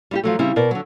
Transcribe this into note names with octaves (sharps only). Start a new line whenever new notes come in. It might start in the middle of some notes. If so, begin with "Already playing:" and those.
G3 E4 G4
F3 F#3 A3
C#3 G3 C4 E4
B2 A#4 D5
D3 F#3